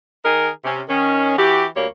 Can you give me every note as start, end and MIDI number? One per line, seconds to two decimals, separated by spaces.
0.25 0.49 51
0.25 0.49 63
0.25 0.49 68
0.25 0.49 70
0.64 0.81 48
0.64 0.81 61
0.88 1.37 51
0.88 1.37 61
1.38 1.65 52
1.38 1.65 66
1.38 1.65 67
1.75 1.86 38
1.75 1.86 55
1.75 1.86 58
1.75 1.86 73